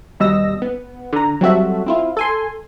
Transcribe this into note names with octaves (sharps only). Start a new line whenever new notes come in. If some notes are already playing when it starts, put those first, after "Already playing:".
D#2 B2 G3 D#5 E6 A#6
B3
D3 A#5
F#3 G3 C4 F#4 A4 E5
C4 E4 F4
A4 G#5 C6